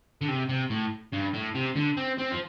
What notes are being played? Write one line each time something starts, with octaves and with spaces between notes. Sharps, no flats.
D3
C3
C3
A2
G2
A2
C3
D3
C4
C4
F3